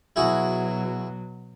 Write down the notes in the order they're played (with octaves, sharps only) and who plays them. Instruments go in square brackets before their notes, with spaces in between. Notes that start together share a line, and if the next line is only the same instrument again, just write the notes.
[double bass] B2 F#3 [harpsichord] E4 F#4 G#4